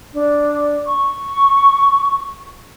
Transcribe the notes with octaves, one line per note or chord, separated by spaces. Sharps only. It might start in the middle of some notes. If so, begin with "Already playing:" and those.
D4
C#6